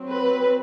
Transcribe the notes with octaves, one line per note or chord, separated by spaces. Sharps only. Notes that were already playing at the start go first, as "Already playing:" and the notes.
Already playing: F#3 C4
B4